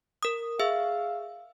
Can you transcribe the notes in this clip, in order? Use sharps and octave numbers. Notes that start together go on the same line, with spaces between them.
A#4 D#6
G#4 E5 F5 E6